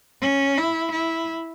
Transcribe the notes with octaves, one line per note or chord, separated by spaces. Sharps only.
C#4
E4
E4